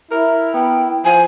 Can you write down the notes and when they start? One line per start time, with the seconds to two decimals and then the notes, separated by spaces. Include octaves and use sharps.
0.11 E4 A#4
0.54 B3 G5
1.05 F3 C5 G#5